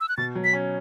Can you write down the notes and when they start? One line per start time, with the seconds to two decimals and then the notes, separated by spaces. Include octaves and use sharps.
0.01 E6
0.09 F#6
0.17 B2 A6
0.35 F#3
0.44 B6
0.53 C#4